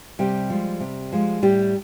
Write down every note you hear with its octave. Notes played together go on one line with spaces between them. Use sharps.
C3 G3 G4
F3 G#3
C3
F3 G#3
A2 G3 G4